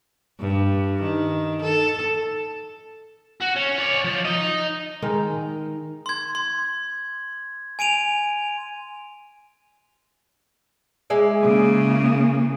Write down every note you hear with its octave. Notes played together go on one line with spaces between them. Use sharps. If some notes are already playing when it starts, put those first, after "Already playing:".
G2
D#3
A4
F#4
C#4
C#5 D5
F3
D#4 D#5
D#3 G#3 A#4
C6 G#6
C6
G#5 D7 D#7 F7
G#3 E4 D5
C#3 A#3